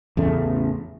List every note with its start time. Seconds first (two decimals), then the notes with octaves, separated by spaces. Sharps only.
0.17 A1 E2 C#3 A3